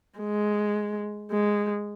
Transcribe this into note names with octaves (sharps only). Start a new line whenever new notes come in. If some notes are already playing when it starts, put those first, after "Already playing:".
G#3
G#3